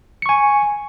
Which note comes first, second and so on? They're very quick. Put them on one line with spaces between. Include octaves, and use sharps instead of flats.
C#7 C#6 G#5